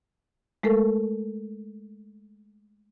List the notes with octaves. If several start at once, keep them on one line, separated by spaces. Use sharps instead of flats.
G#3 A3 A4 A#4